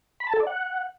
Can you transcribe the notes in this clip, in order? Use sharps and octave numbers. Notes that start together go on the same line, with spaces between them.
B5
A5
A4
D5
F#5